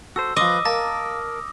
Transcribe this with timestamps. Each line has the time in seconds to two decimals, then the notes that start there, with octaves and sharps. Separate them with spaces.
0.16 F#4 A4 C5 E6
0.36 F3 B4 D#5 C6 D6 D#6
0.65 A#3 A#4 A5 A#6